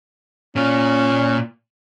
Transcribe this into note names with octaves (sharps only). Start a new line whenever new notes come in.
A#2 C#4 F4